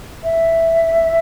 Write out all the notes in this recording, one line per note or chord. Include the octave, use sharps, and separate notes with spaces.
E5